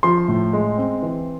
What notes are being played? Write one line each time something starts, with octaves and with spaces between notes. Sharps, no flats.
F3 C6
A2
G#3
C4
E3